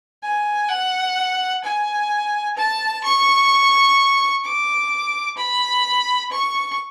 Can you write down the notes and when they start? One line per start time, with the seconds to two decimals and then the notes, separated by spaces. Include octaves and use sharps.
0.23 G#5
0.69 F#5
1.64 G#5
2.57 A5
3.04 C#6
4.45 D6
5.38 B5
6.32 C#6